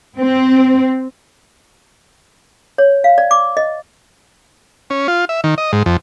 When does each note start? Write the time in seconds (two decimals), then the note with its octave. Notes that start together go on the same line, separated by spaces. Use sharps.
0.17 C4
2.78 C#5
3.04 F5
3.18 D5
3.31 D6
3.57 D#5
4.90 C#4
5.08 F4
5.29 E5
5.44 D#3
5.58 D#5
5.73 G#2
5.86 F2